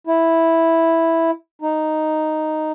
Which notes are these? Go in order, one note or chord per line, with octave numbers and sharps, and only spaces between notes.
E4
D#4